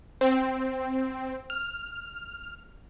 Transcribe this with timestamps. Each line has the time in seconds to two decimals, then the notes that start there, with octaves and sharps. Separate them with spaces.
0.21 C4
1.50 F6